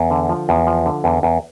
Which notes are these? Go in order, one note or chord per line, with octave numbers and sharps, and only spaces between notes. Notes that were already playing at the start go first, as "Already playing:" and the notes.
Already playing: E2
D3
F3
E2
F3
D3
E2
E2